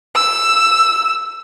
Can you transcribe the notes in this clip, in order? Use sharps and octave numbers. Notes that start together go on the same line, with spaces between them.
E6